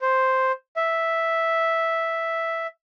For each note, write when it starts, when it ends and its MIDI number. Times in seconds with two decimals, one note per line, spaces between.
0.01 0.52 72
0.76 2.67 76